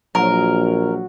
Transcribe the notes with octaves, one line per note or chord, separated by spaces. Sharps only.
A#1 F#3 A#4